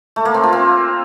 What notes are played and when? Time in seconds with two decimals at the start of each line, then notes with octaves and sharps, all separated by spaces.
0.16 A3
0.25 A#3
0.34 C4
0.43 F4
0.53 C4